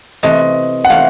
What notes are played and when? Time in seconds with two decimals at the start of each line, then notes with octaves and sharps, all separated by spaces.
0.23 C3 E3 A3 D#5
0.85 F#5
0.89 C3 E3 A3 F5